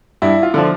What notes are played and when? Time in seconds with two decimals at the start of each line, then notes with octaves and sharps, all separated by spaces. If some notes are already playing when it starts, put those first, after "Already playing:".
0.22 G2 E4
0.43 F4
0.54 D3 F3